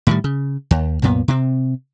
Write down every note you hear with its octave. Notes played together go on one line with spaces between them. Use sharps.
A2 D#3 G3
C#3
D#2
C2 F#2 A#2 B3
C3 C4